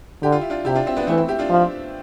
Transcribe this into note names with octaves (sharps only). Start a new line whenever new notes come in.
D3 G4
F4
E4
D4 F4
C3 E4 G4
D4 F4
C4 E4
B3 D4
E3 A3 C4
C4 E4
E4 G4
D4 F4
F3